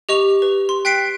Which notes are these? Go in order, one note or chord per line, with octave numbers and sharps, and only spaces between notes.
G4 D#5 C#6 F7
B4
C6
G5 F#6 B6 C7 D7